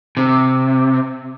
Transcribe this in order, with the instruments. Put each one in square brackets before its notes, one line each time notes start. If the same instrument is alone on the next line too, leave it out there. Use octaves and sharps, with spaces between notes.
[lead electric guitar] C3